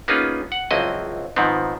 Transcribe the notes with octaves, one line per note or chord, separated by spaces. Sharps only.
A#3 B3 C#4 D#4 F4 G#4
F#5
C#2 F3 F#3 C4 E4 D#5
G#2 D#3 F3 B3 C4